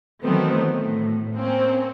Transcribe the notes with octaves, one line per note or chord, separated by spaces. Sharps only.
D#3 E3 F#3 A3 B3 C4
A2
A#3 C4 C#4